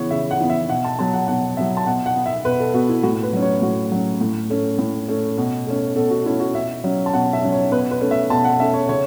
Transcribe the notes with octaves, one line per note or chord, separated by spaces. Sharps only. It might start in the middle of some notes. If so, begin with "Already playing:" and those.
Already playing: C#3 E3 B3 C#5
C#3 E5
F#5
E3 B3
E5
B2 F#5
A5
F#3 B3 A5
F#5
B2 F#5
F#3 B3 E5
A5
B2 F#5
F#5
B3
E5
B2 B4
A4
B3 F#4
E4
A2 F#4
B4
F#3 C#4
C#5
A2 F#4
F#3 C#4
A2
A3 C#4
A2
A3 C#4
B2
A3 C#4
B2 A4
F#4
A3 C#4 E4
F#4
B2 E5
F#3 C#4
A5
B2 F#5
E5
F#3 C#4
C#5
B2 B4
B4
A3 C#4
E5
B2 A5
F#5
A3 C#4 E5
C#5
C#3 C#5